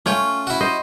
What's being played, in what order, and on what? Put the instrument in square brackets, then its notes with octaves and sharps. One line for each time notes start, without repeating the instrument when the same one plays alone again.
[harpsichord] A3 F4 [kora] C#4 C#5 G5
[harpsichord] E4 F#4
[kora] C5 D#5